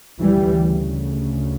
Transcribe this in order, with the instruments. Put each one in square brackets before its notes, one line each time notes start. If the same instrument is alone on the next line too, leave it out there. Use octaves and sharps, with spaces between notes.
[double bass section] D2 C#3 E3 G3